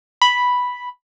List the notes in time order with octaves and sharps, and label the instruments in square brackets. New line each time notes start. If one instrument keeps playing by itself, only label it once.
[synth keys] B5